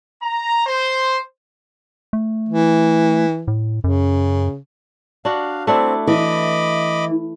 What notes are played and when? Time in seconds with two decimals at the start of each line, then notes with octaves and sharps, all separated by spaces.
0.22 A#5
0.66 C5
2.13 A3
2.49 E3
3.48 A2
3.84 F#2 C#3
5.25 D4 F#4 F5
5.67 A3 C4 D4 E4
6.07 E3 D#5 B5 D6